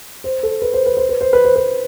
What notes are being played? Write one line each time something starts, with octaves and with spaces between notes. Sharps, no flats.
C5
A4
B4
C5
B4
C5
B4
C5
B4
C5
B4